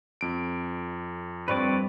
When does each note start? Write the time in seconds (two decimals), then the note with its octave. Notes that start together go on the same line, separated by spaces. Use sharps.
0.21 F2 D7
1.48 G2 C4 B4 C#5 D5